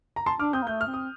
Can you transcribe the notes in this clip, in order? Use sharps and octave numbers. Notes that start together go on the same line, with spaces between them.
A#5
A5 C6
D4 D6 F6
C4 D#6 G6
A#3
A3 G6
F6
C4
D#6